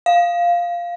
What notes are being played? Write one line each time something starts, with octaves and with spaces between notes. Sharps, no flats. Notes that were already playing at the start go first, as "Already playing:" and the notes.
F5